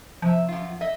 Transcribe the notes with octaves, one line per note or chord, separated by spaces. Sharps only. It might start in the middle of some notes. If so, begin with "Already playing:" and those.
C3 F3 E5
F#2 F4
D#5 E5